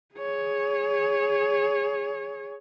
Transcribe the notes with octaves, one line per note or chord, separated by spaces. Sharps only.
G#4 C#5